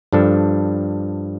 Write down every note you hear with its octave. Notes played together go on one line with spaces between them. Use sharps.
G2 F3 D4 A4